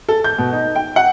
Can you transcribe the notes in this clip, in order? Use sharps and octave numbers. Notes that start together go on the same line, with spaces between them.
A4
G6
B2
D#4
G5
F#5